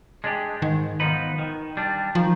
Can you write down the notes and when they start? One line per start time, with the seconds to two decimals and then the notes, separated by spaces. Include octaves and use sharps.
0.24 G#3 D4 G4
0.62 G#2 D#3
1.00 F3 B3 D#4 B4
1.38 D#3
1.77 G3 D4
2.15 D#3 F3